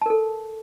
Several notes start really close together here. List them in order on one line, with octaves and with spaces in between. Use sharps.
A5 A#4 A4